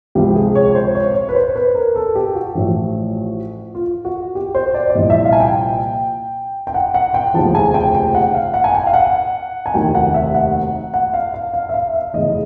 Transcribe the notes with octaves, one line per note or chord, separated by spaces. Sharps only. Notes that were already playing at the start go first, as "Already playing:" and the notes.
C#2 C3 F3 G4
G#4
C#5
C5
C#5
C#5
B4
C5
B4
A#4
A4
G4
F#4
A1 A2 F3
F4
F#4
G4
C5
D5
D5
C2 A#2 F3 D#5
E5
F5
G#5
G5
G5
F#5
F#5
G5
F1 D#2 C#3 F3 A5
G#5
G5
G5
F#5
F5
F#5
G#5
G5
F5
F#5
G#5
F1 D#2 D#3 F#3 G5
F#5
E5
F#5
F#5
F5
F5
F5
E5
F5
E5
F1 E2 C#3 D#5